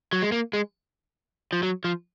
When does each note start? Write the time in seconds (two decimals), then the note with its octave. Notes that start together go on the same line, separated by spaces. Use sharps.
0.13 F#3
0.22 G#3
0.32 A#3
0.53 G#3
1.53 F3
1.63 F#3
1.84 F3